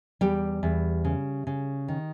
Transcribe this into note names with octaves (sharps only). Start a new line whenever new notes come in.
E2 G3 G4
E2
C#3
C#3
D#3